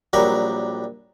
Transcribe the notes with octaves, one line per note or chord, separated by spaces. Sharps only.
A#1 F#3 G3 A#4 B5